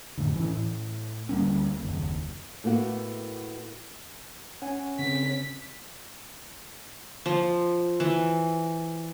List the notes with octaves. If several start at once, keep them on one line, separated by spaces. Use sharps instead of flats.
F#2 A2 D3
E3 C#4
A2
D2 G3 A#3 C#4
F#1 D#2
A2 A#3 B3 F#4
C#4 F#5 G#5
C#3 C4 B6
F3
E3